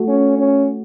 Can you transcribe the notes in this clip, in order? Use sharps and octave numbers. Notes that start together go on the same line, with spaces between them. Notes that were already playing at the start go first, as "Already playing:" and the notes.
Already playing: A3 F#4 A4
C#4
C#4